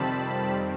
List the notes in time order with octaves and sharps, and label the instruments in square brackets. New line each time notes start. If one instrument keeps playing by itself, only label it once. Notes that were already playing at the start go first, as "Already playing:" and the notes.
Already playing: [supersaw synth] F2 C3 D#3 G3 C4 A5 B5